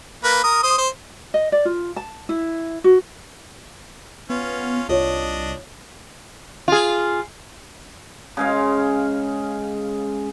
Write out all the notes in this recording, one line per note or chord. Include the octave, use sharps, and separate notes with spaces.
A#3 B4
A#4 D#6
C5 D#6
C5
D#5
D5
F4
A5
E4
F#4
B3 C#4 F4
C2 D4 F4 C#5 D#5
F4 G#4
C#3 G#3 F5